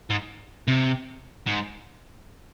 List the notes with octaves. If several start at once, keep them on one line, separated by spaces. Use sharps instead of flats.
G#2
C3
G#2